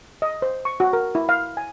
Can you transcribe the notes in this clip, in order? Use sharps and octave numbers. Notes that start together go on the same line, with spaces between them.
D#5
C5
C#6
F#4
A#4
E4
F5
G#5